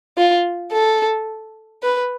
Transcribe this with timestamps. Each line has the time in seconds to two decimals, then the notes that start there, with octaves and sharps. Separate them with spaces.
0.18 F4
0.72 A4
1.83 B4